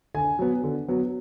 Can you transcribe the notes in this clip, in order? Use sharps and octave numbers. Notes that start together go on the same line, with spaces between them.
D3 G#5
F#3 B3
D3
F#3 B3